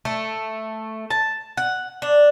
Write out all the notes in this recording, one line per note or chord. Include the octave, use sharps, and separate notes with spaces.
A3
A5
F#5
D4